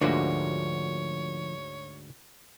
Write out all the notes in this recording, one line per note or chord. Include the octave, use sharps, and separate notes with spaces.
D2 G#2 D3 F3 A#3 F#4 C#5